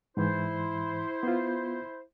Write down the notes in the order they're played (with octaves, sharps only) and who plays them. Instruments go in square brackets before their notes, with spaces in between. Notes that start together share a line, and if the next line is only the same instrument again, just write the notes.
[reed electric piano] G#2 E3 [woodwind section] E4 C5
[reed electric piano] B3 F4